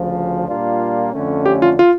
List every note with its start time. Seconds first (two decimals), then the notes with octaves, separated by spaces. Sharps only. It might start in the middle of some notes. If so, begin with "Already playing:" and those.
Already playing: D2 C#3 F3
0.47 A#2 G3 A#3 D4 F4
1.13 F2 D3 A3 C#4
1.46 G4
1.62 F4
1.79 F4